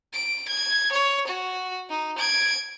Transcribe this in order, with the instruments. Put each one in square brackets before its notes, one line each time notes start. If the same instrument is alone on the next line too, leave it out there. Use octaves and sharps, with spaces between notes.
[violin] D7
G#6
C#5
F#4
D#4
G#6 D7